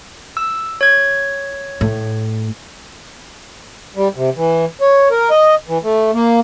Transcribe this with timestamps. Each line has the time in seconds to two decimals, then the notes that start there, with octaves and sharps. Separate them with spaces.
0.37 E6
0.81 C#5 G#6
1.81 A2
3.96 G3
4.16 C3
4.37 E3
4.81 C#5
5.11 A#4
5.30 D#5
5.68 E3
5.83 A3
6.14 A#3